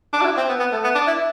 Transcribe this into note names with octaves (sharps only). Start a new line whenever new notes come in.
D4
F#4
E4
C4
B3
B3
A3
B3
D4
E4